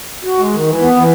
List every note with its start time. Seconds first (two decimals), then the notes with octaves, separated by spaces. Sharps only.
0.24 F#4
0.38 G#3
0.53 D#3
0.67 E3
0.82 B3
0.96 E3